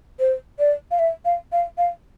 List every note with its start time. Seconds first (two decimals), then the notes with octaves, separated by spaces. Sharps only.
0.19 C5
0.59 D5
0.91 F5
0.99 E5
1.25 F5
1.52 F5
1.78 F5